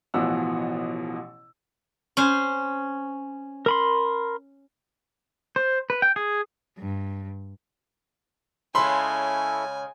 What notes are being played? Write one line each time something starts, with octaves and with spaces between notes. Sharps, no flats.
A1 B2 E3 F3 F#5 E6
C#4 C5
A#4 B5 C6
C5
B4
G5
G#4
G2
C#3 G#3 C#4 E4 A4 G#5 B5 C6